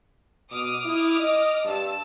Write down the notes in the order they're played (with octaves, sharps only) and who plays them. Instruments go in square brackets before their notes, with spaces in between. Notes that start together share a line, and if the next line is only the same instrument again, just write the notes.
[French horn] B2 [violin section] D6 D#6 F6
[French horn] E4
D#5
[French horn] G2 [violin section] A5 E6